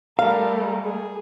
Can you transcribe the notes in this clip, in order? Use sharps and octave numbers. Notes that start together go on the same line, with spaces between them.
G3 A3 A#4 F5
G#4